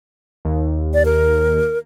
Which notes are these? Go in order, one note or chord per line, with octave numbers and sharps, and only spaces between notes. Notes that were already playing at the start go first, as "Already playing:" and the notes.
D#2
D5
A#4